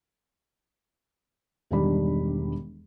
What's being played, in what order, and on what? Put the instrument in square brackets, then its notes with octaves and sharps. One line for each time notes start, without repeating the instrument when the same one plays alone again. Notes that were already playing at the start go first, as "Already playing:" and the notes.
[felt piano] E1 G2 D#3 G3 D4 B5